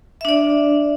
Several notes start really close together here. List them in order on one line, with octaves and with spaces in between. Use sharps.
E5 D4 D5